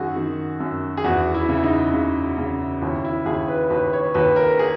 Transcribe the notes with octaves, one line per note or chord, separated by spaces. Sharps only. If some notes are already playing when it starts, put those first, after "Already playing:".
Already playing: F#2 D#3 F#4 G#4
D#3
F#2
G#4
E2 F#4
E4
C#3
D#4
C#3
C#3
D#2 E4
E4
D#2 G#4
B4
D#2 B4
C#5
D#2 B4
A#4
G#4